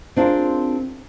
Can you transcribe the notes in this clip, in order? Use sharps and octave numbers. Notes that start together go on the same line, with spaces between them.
C4 D4 F4 G#4 A#4